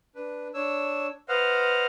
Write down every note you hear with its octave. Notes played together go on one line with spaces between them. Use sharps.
D4 B4
D4 C#5 E6
B4 C5 D#5 F5 F#5 F6